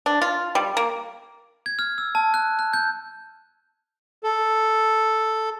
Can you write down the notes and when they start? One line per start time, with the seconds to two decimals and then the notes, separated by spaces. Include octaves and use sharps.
0.06 D4
0.22 F4
0.55 G3
0.77 A#3
1.66 G#6
1.79 F6
1.98 E6
2.15 A5
2.34 F#6
2.59 F#6
2.73 G6
4.24 A4